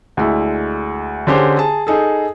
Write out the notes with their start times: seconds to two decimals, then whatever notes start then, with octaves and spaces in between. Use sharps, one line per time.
0.17 D2 G#3 E4
1.27 D3 C#4 G4 G#4 C5
1.57 G#4 A5
1.87 D#4 G#4 A4